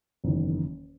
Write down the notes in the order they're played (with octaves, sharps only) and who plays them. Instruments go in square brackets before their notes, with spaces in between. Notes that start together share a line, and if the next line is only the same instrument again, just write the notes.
[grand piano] F#1 E2 D#3